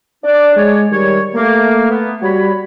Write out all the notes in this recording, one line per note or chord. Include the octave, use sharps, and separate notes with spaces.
D4 D5
G#3 G#4 C#5 D5
D#3 G3 C#5
A3 A#3
B3
G3 F#4 C#5 B5